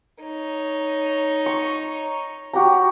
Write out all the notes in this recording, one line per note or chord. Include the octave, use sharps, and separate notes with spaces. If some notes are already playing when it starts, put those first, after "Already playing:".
D#4 C#5
C#6
F#4 G4 A#5